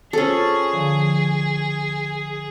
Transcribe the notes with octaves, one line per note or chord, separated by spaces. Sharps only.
C#4 F4 G#4 A4 C5
D3 F3